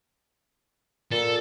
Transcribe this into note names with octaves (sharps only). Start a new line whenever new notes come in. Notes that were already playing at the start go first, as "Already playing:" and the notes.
A#2 A4